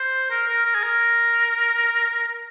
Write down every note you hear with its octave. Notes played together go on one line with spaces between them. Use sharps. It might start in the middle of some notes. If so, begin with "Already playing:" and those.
Already playing: C5
A#4
A#4
A#4
G#4
A#4